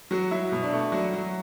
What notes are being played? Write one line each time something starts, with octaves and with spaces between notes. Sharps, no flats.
F#3 F#4
F#3 E4
B2
D4
A3
F#3 F#4
F#3